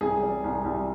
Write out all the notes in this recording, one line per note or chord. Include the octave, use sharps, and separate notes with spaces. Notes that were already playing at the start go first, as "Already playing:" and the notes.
C2 G#4
G3
C2
C2